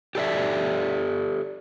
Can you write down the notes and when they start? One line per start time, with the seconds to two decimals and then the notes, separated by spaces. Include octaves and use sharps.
0.15 G4 A4 D5 E5